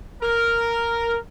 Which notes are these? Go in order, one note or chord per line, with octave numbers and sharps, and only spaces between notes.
A#4